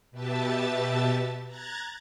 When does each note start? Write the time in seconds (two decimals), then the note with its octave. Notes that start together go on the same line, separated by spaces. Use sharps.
0.11 B2 B3 G4 E5 A5 A6
1.46 A#5 F#6 G#6 A6